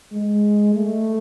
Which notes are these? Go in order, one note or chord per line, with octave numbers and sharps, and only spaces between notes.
G#3
A3